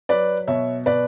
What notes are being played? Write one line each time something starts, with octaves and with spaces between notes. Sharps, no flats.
F#3 B4 D5
B2 C#5 E5
B2 B4 D5